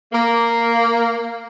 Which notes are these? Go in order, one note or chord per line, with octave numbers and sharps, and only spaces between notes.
A#3